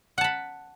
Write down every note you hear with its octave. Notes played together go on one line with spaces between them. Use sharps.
F#5 A5 B5